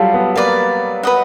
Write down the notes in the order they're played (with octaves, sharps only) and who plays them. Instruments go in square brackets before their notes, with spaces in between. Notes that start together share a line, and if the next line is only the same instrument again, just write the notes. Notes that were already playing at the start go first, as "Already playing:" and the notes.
Already playing: [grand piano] F#3 G3 [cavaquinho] F4 A4 F5
[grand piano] B3
[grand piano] A#3 [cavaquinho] B4 D5 F5
[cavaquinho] B4 D#5 F#5